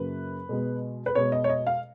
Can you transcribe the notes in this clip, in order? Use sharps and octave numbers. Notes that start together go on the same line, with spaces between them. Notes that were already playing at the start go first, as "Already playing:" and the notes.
Already playing: F#2 C#3 F#3 A#3 B4
B2 G#3 B3
B4
B2 G#3 B3 C#5
D#5
C#5
D#5
F5